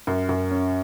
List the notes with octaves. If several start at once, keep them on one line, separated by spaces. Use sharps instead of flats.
F#2
F#2
C#4